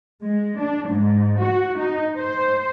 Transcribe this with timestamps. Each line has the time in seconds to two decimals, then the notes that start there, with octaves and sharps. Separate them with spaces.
0.24 G#3
0.60 D4
0.89 G#2
1.42 F#4
1.79 D#4
2.16 C5